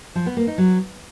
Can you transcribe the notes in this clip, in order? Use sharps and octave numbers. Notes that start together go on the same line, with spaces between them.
F3
B3
A#3
D#4
F#3